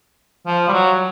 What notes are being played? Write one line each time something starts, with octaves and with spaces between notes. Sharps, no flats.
F3
G3
F#3